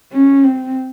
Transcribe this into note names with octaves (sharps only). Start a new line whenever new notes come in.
C#4
C4